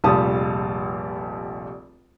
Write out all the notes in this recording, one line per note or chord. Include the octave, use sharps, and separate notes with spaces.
F1 A#1 G3 F4 A5 D#6